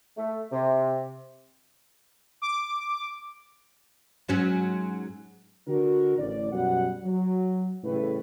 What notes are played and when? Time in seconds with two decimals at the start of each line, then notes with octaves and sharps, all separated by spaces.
0.18 A3
0.52 C3
2.42 D6
4.28 G#2 F#3 C#4
5.68 D3 F#4 A#4
6.18 A1 D5
6.52 F#2 B2 G3 F#5
7.03 F#3
7.84 A1 A2 C#3 G3 A3 B4